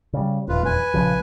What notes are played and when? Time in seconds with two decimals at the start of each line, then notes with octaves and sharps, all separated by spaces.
0.13 C#3 G3
0.48 D#1 E2 F4 B4
0.65 B4 G#5
0.94 A#1 C#3 F3